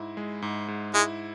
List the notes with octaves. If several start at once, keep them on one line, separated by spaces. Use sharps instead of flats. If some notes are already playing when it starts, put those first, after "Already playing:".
Already playing: G#2 E4
G#3
G#2
G#2
G#3 E4